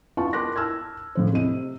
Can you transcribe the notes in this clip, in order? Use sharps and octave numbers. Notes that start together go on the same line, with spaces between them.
B3 F4 A5 C#6
A#4 C6 D6 F#6 A#6
A5 E6 F6 G#6
A2 F3 C5
C3 D#5 D#7